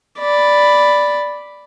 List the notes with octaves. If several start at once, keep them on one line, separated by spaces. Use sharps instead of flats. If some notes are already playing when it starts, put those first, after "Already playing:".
D5 B5